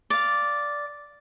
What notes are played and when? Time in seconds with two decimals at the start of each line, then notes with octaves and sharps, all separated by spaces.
0.10 D5 F5